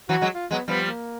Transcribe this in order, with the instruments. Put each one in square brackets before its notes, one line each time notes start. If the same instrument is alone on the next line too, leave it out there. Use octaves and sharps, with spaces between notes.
[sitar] E3 F#3 [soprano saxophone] F#4
[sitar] F#3 G#3
[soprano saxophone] F4
[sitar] F#3 G#3 [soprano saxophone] B3
[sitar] F3 G3 [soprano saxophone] B3
[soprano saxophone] A#3